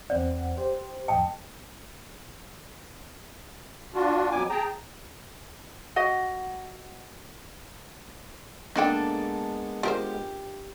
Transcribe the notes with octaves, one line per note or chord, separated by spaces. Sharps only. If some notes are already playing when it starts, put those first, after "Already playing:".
E2 C4 D5 F#5
G4 C5
F2 A2 D#5 G5 A5
D4 F4 F#4
F2 B2 F#3 B3 G#5 D6
G#4 G5 A5 A#5
F#4 D#5 F#5
G#3 A#3 B3 D4 D#4 A4 G5
F4 G4 A#4 C5